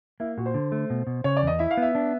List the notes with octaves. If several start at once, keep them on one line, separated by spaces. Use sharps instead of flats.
A#3 E4
A#2 F#4
C5
D3
A3
B2
B2
C#3 C#5
D5
E2 D#5
E4 E5
F5
B3 E5
D4